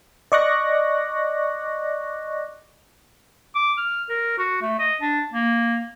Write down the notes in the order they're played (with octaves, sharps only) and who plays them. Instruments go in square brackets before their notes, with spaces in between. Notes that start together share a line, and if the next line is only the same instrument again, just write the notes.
[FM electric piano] D5 D#5 C#6 D6 F#6 A#6
[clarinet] D6
F6
A#4
F#4
A3
D#5
D4
A#3